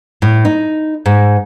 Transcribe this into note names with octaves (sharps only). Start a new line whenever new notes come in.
A2
D#4
G#2